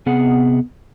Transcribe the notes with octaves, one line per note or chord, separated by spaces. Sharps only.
C3 B3 G#4 F#5